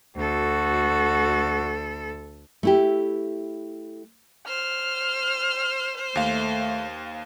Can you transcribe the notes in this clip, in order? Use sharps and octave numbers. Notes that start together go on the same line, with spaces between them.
D2 F#4 A4
A3 E4 G4
C5 F6
D#2 A3 F5